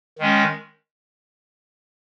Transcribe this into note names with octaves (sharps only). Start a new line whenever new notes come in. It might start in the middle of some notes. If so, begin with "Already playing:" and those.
D#3 G#3 C#4